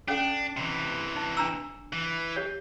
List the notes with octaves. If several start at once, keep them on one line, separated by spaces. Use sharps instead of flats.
C#4 D4 A4 F#5
C3 E3
D#4
D4 A#5 E6
E3
G4 C#5